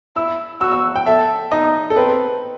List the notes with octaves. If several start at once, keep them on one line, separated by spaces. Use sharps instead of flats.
E4 E6
F#4 E6
E6
G5
A4 E5
D#4 D#5
A4
C4 B4